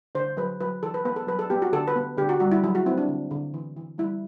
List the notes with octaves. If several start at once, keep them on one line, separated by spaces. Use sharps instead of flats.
D3 C5
F#3 B4
F#3 B4
E3 A4
B4
B3 B4
A4
F#3 B4
A4
B3 G4
F#4
D3 A4
B4
B3
D3 G4
F#4
G3 F#4
E4
F#3 E4
F#4
C4 E4
D4
D3
D3
E3
E3
G3 E4